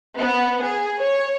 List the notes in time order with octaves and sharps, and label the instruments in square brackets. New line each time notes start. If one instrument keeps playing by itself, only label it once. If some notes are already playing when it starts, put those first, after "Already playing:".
[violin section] B3
G#4
C#5